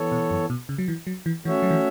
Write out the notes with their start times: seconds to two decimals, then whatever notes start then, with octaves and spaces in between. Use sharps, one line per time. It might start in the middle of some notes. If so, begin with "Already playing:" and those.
Already playing: E3 B3 A4 C#5
0.12 B2
0.31 F#2
0.50 B2
0.69 C#3
0.78 F#3
0.88 E3
1.07 F#3
1.26 E3
1.45 E3 A3 C#4 F#4 C#5 E5
1.62 F#3
1.71 E3